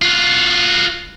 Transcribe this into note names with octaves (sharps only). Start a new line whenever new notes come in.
F4 F#4